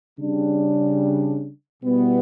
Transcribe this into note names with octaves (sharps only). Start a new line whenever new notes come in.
C#3 G3 D4
B2 G3 B3 E4